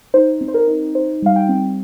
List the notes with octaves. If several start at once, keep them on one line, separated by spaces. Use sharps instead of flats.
D#4 C5
C4
C5
A#4
D#4
D#4 C5
G3 F5
G5
C4